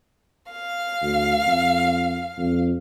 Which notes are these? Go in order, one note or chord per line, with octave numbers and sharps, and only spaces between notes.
F5
D2
F2
F2